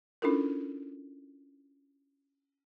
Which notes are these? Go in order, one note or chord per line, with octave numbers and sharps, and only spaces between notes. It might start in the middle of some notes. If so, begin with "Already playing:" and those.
C#4 D4 E4 F4 A4 A#4